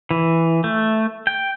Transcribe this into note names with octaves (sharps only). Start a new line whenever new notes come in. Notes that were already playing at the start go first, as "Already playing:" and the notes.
E3
A3
G5